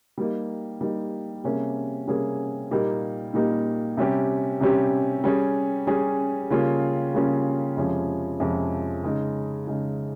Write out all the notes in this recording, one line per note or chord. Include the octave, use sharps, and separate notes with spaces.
G3 A#3 D#4
G3 A#3 D#4
C3 G3 A#3 C#4 G#4
C3 G3 A#3 C#4 G#4
A#2 G3 A#3 D#4 G4
A#2 G3 A#3 D#4 G4
C3 G3 C#4 G4
C3 G3 C#4 G4
G3 C#4 G#4
G3 C#4 G#4
C#3 G3 A#3 C#4 F4
C#3 G3 A#3 C#4 F4
F2 C3 F3 G#3 C#4
F2 C3 F3 G#3 C#4
C#3 G#3 D#4
C#3 G#3 D#4